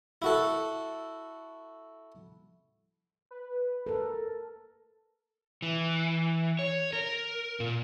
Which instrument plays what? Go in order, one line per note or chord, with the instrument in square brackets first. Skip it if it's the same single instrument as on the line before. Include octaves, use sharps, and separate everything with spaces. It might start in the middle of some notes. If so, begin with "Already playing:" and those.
[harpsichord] E4 F#4 A4
[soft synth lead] B4
[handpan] A4 A#4
[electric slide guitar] E3
C#5
A#4
A#2